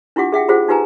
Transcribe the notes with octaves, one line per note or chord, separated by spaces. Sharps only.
D4 E4 F4 G4 F#5 D6
G#4 E5 F#5 G5
F4 G4 G#4 C5 F#5
D#4 F4 G4 B4 G#5 A#5